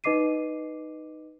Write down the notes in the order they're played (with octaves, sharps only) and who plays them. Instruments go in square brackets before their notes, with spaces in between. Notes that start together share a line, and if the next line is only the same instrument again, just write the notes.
[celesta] D#4 B4 D#5 D6 C7 D#7